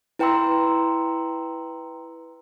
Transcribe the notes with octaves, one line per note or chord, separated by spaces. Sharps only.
E4 B4 G5 A#5 C6 E6